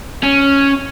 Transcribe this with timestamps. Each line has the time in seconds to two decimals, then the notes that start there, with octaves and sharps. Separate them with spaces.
0.23 C#4